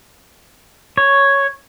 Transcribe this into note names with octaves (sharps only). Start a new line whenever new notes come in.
C#5